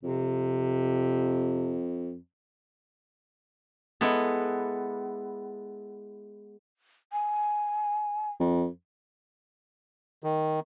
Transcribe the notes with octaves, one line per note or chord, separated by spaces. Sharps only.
F2 C3
G#3 B3 E4 A4
G#5
F2
D#3